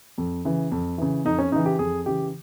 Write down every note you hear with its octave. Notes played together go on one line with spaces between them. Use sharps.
F2
C#3 E3
F2
C#3 E3
F2 D#4
C#4
C#3 E3 D#4
G4
F2 G#4
C#3 E3 G4